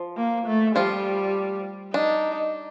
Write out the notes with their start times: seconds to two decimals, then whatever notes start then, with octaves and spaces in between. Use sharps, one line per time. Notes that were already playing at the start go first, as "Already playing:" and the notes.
Already playing: F3
0.17 A#3
0.47 A3
0.75 F3 G3 F4
1.94 D4 D#4